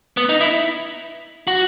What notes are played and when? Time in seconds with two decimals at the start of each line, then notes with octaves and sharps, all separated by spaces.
0.17 B3
0.29 D#4
0.41 E4
1.47 F#4